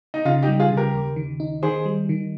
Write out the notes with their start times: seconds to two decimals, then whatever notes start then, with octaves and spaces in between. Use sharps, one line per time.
0.14 D#4
0.25 C#3 F4
0.42 D#4 G4
0.48 G3
0.60 F4 G#4
0.71 C#3
0.77 G4 A#4
0.94 D#2
1.16 D#3
1.40 D#4
1.63 D#3 G#4 C5
1.85 G3
2.09 D#3